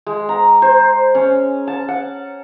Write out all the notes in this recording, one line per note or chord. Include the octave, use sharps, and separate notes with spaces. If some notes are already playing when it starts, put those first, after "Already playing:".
G#3
A#5
C5
C#4
A5
F#5